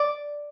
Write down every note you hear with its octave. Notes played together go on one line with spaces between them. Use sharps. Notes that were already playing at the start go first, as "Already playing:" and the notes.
Already playing: D5